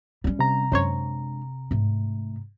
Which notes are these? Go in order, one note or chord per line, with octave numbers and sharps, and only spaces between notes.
G3 C#4
C3 A#5
F#2 G#3 D4 C5 C#5
G#2 A3